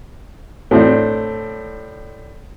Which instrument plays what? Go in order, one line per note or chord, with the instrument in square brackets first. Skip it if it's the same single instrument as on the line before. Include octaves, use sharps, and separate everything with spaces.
[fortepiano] A2 C4 D4